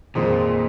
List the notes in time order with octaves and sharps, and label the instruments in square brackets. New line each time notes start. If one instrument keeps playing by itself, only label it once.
[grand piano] F2 D#3 G#3 C4 D#4 [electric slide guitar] A#2